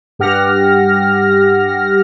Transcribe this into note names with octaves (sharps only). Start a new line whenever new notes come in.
G2 G4 F#5 F6 A#6